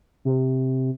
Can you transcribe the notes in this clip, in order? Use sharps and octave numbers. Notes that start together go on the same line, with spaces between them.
C3